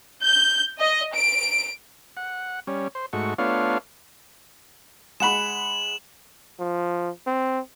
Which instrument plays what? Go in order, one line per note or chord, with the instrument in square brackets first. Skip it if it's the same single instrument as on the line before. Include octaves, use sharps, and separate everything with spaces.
[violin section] G6
D#5
D7
[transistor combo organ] F#5
G3 C#4
C5
G#2 A3 F#4 C#6
A3 B3 D4 F4 C#5 F5
[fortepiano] G#3 F#5 B5 [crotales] E7 F#7
[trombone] F3
C4